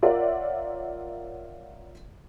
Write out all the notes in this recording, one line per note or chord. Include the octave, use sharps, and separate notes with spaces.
F4 A#4 C#5 D5 E5 F#5